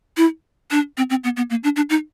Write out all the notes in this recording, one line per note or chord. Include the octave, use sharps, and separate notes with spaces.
E4
D4
C4
C4
B3
B3
A#3
D4
D4
D#4